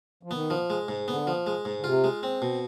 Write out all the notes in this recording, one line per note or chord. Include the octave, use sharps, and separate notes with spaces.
F3
D#3 B3
F3
G#3
G#2
D3 B3
F3
G#3
G#2
D3
C3 F4
G#3
C4
B2